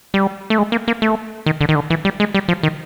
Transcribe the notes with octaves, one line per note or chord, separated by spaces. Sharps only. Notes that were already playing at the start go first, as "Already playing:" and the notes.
G3
A3
G#3
A#3
A#3
A3
D#3
D3
D#3
D3
E3
G3
G#3
G3
F3
D#3